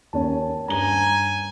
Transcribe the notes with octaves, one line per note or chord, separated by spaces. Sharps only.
D#2 C#4 A5
G2 G#5 A#5 G7